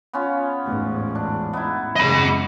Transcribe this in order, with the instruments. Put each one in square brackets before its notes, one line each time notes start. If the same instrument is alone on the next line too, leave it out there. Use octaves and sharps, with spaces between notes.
[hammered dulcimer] B3 C#4 F4
[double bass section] A1 E2 G#2
[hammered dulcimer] D4
B3 D#4 E4
[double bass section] F#1 C#3 G#3 [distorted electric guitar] D#5 B5